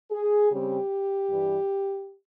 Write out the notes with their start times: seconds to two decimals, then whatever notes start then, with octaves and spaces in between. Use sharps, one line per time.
0.11 G#4
0.50 C#3 G3 C4 G4
1.29 G2 E3 G3